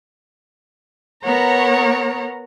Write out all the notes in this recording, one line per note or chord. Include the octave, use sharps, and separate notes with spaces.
B3 A#4 C#5 F#5 A#5